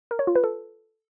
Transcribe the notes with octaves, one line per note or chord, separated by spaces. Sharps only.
A#4
C#5
F4
B4
A4